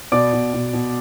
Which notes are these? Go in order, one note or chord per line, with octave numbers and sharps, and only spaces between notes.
B2 D5 D6
B2
B2
B2